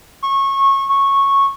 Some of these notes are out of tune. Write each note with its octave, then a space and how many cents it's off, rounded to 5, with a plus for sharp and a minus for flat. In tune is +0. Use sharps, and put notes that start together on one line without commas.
C#6 -20
C#6 -10